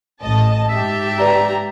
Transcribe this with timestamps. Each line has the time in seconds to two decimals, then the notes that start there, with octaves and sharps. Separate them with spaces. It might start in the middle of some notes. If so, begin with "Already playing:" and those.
0.21 A1 D#5 A5
0.69 G#2 G4 E5 A5
1.20 B4 D5 A#5